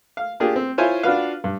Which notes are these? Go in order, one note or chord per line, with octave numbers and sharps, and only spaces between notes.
F5
A#3 D4 F4 G4 G#4
C4
E4 F4 C5 C#5 G#5
D4 F4 F#4 B4 F5
G2